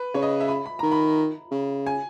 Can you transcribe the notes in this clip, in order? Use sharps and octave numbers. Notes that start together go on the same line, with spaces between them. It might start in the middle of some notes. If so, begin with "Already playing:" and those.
Already playing: B4
C#3 C#5
D#5
E5
B5
B5
D#3 A#5
B5
C#3
G#5